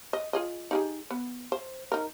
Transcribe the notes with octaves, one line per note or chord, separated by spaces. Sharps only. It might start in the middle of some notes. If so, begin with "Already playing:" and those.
D#5
F4 G#4 D#5
D#4 G4 G#4
B3
C5
D#4 A#4